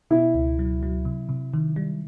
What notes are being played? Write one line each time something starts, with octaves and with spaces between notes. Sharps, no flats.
B2 E4
C#2
F#3
F#3
C3
C3
D#3
G3